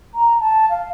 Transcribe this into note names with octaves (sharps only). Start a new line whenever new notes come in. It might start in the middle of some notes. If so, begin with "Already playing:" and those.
A#5
A5
F5